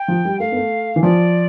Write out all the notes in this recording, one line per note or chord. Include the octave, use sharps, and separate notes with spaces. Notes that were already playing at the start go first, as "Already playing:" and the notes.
Already playing: G5
F3
G3
A3 F5
B3
A3
E3
F3 D5